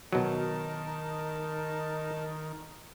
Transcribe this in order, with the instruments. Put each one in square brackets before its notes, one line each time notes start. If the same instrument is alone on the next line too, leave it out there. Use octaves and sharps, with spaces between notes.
[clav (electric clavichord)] B2 F#3 [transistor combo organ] D#3 [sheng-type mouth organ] D#4 A#4 A5